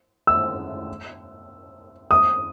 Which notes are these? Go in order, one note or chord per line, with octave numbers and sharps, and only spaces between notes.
E6
D#6